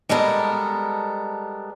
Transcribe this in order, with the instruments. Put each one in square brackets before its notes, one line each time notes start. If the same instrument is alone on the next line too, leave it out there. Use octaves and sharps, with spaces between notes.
[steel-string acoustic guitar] G3 G#3 B3 A4 A#4